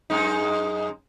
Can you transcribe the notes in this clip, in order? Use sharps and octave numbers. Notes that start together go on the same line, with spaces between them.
F#2 G#3 D#4